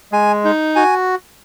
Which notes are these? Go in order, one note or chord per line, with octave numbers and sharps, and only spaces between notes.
G#3 G#5
D#4
F#4 G#5